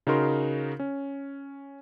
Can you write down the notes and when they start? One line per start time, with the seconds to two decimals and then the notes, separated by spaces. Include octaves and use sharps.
0.07 C#3 D#4 F#4 A#4 C6
0.79 C#4